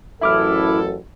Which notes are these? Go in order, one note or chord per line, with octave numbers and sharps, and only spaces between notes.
A1 F#2 E4 A4 E5 D6 F6